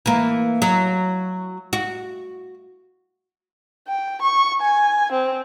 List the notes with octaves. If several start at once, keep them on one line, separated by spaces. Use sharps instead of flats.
E3 A#3
F#3
F#4
G5
C#6
G#5
C4